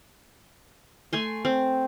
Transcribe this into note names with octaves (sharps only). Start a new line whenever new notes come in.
A3 G#5 C6
C4